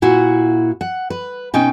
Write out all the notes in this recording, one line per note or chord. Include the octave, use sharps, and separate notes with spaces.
A#2 E4 F#4 F#5
F#5
B4
B2 C#4 D#4 G5